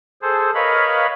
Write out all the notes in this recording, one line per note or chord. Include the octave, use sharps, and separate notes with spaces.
G#4 A4 C5
A#4 B4 C#5 D#5 F5 B5